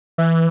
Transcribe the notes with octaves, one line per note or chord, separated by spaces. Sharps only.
E3